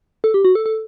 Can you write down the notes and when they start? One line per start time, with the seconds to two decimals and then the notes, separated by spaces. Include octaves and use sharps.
0.24 A4
0.34 G4
0.45 F#4
0.55 A4
0.66 A4